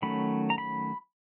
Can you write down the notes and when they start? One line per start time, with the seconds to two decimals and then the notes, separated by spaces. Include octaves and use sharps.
0.02 D#3 F#3 A3 C#4 B5
0.50 A#5
0.58 B5